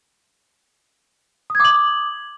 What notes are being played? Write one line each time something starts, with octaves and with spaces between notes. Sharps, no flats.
D6 D#6 G#6 F#7